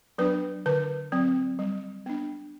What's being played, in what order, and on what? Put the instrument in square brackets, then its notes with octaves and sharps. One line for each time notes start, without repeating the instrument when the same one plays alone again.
[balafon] F#3 B3 D4 B4
D3 B4
F#3 C4
G3
B3 D4